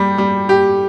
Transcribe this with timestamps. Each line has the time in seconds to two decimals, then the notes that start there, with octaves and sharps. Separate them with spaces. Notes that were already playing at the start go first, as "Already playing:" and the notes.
Already playing: G3 G4
0.18 G3
0.49 G4